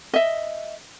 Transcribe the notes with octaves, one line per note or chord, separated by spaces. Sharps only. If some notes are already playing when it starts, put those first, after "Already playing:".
D#5 E5